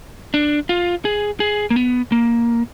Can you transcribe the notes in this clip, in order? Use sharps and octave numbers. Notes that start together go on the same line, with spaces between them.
D4
F4
G#4
G#4
A#3
B3
A#3